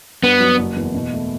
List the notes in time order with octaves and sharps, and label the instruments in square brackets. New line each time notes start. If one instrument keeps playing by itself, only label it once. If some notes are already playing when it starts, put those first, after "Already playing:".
[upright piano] G2 [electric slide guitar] B3
[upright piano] F#3
F#1
E2
B2
A3